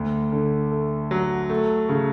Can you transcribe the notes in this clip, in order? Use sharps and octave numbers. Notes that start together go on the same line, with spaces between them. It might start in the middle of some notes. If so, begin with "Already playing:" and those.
Already playing: D2
D3
A3
F#3
A3
C#3